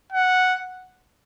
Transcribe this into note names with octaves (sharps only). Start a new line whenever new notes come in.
F#5